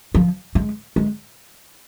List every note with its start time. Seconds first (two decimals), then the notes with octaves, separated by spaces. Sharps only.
0.14 F3
0.55 G#3
0.96 G#3